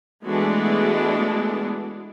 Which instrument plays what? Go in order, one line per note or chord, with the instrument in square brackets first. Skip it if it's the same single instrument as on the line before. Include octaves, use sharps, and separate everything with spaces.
[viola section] E3 G#3 A3 B3 D4 F#4